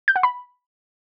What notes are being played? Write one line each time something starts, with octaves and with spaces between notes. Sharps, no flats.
G6
F#5
B5